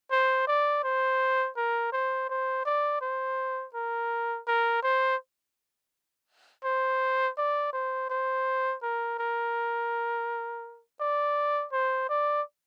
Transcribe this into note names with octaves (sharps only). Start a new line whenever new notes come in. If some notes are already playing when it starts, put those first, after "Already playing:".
C5
D5
C5
A#4
C5
C5
D5
C5
A#4
A#4
C5
C5
D5
C5
C5
A#4
A#4
D5
C5
D5